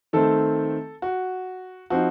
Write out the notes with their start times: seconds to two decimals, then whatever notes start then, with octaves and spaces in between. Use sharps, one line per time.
0.13 D#3 A3 C4 A4
1.02 F#4
1.90 F3 C4 D#4 F#4